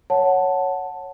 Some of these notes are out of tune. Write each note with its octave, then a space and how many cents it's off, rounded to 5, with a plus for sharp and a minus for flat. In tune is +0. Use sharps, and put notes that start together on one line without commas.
C#5 +0 F#5 +0 A5 +0